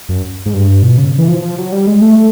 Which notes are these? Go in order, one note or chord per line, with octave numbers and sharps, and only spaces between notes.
F#2
G#2
G2
B2
C#3
E3
F3
F3
F#3
G3
G#3
A3